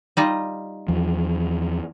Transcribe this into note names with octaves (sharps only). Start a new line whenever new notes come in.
G3 D#4 F4
E2 F3